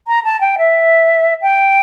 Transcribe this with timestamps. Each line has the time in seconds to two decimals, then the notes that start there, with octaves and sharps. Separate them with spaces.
0.07 A#5
0.24 A5
0.41 G5
0.58 E5
1.42 G5